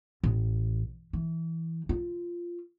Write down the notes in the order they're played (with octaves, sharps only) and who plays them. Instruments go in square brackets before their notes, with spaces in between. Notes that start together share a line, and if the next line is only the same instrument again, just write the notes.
[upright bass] A1
E3
F4